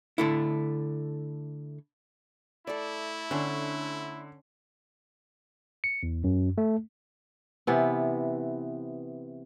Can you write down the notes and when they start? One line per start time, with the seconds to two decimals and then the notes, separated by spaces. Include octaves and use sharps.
0.18 D3 A3 E4
2.67 A3 E4 A4 D5
3.31 D3 C#4 D4
5.84 C#7
6.03 E2
6.24 F#2
6.58 A3
7.67 C3 E3 B3